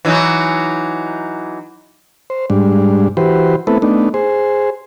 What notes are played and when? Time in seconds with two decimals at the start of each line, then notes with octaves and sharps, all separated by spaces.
0.05 E3 F#3 D#4
2.30 C5
2.50 G#2 G3 D4
3.17 E3 F#4 G4 B4 C5
3.67 A3 B3 C4 E4 A4 B4
3.82 A3 B3 D4 D#4
4.14 G#4 C5